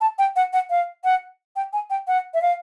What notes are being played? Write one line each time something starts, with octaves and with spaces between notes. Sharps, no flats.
A5
G5
F#5
F#5
F5
F#5
G5
G#5
G5
F#5
E5
F5